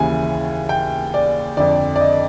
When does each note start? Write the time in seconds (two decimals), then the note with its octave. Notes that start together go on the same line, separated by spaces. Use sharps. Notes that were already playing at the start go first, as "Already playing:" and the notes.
Already playing: D#2 C#3 E3 G#5
0.69 G5
1.14 D5
1.57 F2 D3 D5
1.96 D5
2.01 D#5